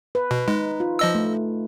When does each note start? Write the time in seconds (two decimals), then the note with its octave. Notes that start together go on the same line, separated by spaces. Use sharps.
0.15 B4
0.31 B2
0.48 G#3 D#4
0.80 F4
0.99 F3 D#5 E6
1.15 A3